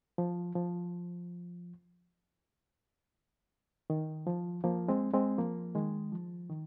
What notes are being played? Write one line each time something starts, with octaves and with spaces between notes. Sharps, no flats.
F3
F3
D#3
F3
F3 A#3
G#3 C4
G#3 C4
F3 A#3
D#3 G#3
F3
D#3